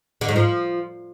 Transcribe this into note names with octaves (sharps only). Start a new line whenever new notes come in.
D3
G#2
F3